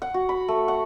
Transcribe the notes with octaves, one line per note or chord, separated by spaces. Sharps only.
F#5
F#4
B5
A3
F#5